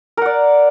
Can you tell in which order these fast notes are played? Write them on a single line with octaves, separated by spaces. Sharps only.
A#4 F#5 D5